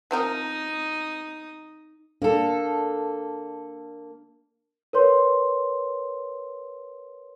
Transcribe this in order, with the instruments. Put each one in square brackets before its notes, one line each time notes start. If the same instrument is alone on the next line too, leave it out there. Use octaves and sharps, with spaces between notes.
[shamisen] F3 C4 A#4 [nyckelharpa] D#4 D#6
[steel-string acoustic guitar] A#3 A4 [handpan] D4
[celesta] A#4 B4 C#5 C6